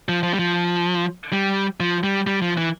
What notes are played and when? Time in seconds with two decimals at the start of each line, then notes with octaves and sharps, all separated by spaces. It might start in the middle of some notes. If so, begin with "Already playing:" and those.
0.09 F3
0.23 F3
0.34 G3
0.39 F3
1.33 G3
1.80 F3
2.04 G3
2.27 G3
2.42 F3
2.57 E3